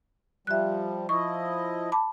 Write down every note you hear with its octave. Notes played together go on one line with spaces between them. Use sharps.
F3 G3 E5 F#6
F3 E4 D#5 C#6
A5 B5 D6